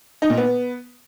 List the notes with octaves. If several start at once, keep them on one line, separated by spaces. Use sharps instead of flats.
D#4
A#2
B3